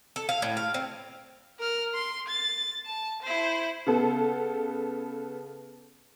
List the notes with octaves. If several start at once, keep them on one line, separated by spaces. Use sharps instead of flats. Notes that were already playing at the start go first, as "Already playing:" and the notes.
A4
F5
A2
F5
C4
A#4 F6
C6
A6
A5
E4 C5
C#3 B3 A4